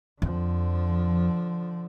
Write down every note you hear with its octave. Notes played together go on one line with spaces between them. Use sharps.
F2 D3 F3